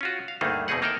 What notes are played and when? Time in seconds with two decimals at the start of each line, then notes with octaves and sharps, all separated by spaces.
0.01 C#4 F4 F#4
0.28 F5
0.41 D2 G2 A3 A#3 D#4 G#4
0.68 E2 B2 C4 D#4 G#4 F#5
0.82 A#3 D#4 A4 A#4 F#5 G5